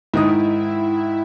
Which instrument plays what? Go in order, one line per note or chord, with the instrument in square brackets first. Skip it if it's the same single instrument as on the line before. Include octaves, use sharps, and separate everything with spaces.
[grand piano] G#2 D#3 D#6 [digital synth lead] E4